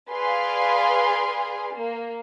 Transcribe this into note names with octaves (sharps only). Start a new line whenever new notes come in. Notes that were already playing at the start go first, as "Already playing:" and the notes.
G#4 B4 D5 F5 G#5 C6
A#3